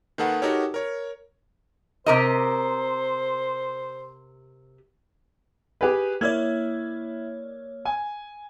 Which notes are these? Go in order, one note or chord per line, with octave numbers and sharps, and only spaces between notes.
D#3 A#3 G#4 A4 B4 F#5
D#4 F#4 G4 A4 A#4 C#5
A#4 C#5
C3 A#4 C5 D#5
G4 G#4 B4
A#3 E4 C#5 D5 G#6
G#5